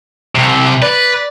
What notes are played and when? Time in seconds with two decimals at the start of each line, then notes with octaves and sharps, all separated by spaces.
0.35 C2 C3
0.82 B4 D5